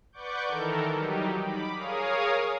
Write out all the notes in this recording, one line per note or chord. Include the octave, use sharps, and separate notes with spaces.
B4 D5 F#5 C#6 D6 G6
D#3 E3 A4 A#4
F#3 G3 D#4 G4
B5 D6
G#4 A#4 C#5 F5 D#6